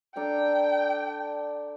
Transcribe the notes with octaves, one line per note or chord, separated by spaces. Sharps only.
D4 A4 G5 A#5